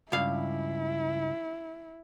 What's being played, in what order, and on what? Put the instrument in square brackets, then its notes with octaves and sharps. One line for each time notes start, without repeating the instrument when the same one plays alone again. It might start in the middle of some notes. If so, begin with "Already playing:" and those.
[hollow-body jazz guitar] C#2 G2 F5 [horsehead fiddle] E4